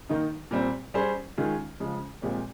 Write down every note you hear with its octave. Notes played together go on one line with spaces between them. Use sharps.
D#3 A#3 D#4
A#2 G3 C4
G3 C#4 G#4 C5
D#3 G#3 C#4 F4 G#4
C#3 F3 G#3
A#2 F3 G#3 C4 G4